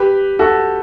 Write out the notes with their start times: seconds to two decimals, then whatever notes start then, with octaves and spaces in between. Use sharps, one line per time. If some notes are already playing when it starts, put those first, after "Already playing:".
Already playing: G4 B4
0.39 F#4 A4